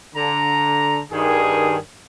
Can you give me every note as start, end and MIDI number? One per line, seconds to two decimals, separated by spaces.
0.15 0.99 50
0.15 0.99 82
1.11 1.76 43
1.11 1.76 51
1.11 1.76 68